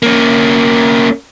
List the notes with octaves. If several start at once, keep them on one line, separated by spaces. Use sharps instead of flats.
A#3 C#4